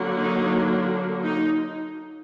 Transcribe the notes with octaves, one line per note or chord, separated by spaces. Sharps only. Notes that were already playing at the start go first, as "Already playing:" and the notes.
Already playing: D3 F#3 A#3
D#4
D#4